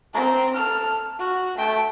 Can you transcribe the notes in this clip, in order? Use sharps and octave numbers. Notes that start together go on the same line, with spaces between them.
C4 A#5
A4 F6
F#4
A3 G5